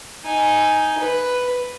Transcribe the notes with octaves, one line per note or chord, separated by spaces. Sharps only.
D#4 G#5
B4